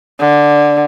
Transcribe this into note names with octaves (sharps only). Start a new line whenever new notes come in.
D3